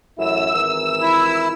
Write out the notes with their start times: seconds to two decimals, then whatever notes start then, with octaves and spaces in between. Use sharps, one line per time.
0.18 A1 F#2 E4 E6
0.55 G#1 E3 A#4
1.01 E4